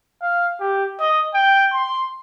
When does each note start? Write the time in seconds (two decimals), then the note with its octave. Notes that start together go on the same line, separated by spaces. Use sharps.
0.22 F5
0.60 G4
1.00 D#5
1.34 G5
1.74 C6